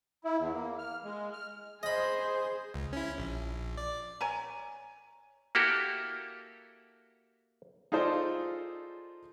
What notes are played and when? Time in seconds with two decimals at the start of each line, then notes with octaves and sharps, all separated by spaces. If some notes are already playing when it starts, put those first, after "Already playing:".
0.24 E4
0.39 E2
0.53 A#3
0.79 F6
1.04 G#3
1.33 F6
1.83 G#4 C5 D#5 B5
2.74 C#2
2.93 C#4 E4
3.18 A#1
3.78 D5
4.21 C#5 G#5 A#5
5.55 A#3 E4 F#4 G4 A4
7.92 D#4 F4 G#4 A4 C5 D5